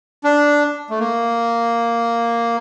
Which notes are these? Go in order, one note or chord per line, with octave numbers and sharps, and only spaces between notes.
D4
A3
A#3